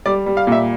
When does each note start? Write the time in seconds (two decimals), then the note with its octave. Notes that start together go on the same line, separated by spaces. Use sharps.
0.06 G3 D5
0.26 G3
0.37 F5
0.47 A#2 E5